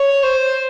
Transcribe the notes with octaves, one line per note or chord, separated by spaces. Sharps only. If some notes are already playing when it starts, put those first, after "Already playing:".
Already playing: C#5
C5